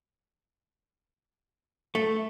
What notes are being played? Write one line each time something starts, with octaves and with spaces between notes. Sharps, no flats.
A3